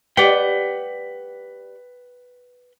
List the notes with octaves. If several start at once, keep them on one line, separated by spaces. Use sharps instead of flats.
G4 B4 D5 F#5 G5